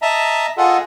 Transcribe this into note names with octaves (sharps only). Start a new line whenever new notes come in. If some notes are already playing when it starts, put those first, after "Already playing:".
D#5 E5 A5 A#5
F4 G#4 A4 D#5 F#5